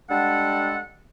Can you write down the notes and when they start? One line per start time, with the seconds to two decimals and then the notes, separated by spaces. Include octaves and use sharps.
0.10 G3 G#3 D4 A4 F#5